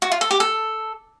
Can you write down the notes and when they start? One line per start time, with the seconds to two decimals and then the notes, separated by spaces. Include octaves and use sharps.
0.02 F#4
0.12 F4
0.21 A4
0.31 G4
0.40 A4